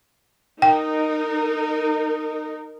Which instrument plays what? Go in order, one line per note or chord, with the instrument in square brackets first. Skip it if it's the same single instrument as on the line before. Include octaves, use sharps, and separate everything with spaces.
[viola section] D#4 A#4 [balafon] G5